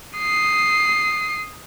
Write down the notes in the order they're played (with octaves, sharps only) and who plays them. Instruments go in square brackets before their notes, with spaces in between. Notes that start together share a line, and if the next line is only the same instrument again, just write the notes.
[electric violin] D#6 C7